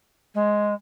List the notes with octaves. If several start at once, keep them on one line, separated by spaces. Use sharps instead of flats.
G#3